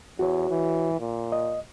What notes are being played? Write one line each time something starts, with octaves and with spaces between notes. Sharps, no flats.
E2 F#4 C#5
E3
A#2
D#5